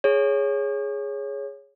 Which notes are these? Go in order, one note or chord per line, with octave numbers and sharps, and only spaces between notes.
G#4 C#5